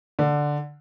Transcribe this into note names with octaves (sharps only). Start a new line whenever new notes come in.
D3